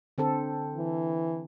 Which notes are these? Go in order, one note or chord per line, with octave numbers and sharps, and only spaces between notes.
D3 C4 A4
E3